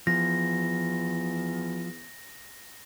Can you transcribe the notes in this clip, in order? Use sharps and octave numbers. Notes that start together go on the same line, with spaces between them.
E2 F3 A#6